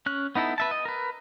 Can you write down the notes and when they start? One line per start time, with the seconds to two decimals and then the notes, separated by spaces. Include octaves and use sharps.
0.06 C#4 F#6
0.36 B3 D#4 E4 A4
0.58 B4 E5 A5
0.71 D#5
0.85 A#4 B4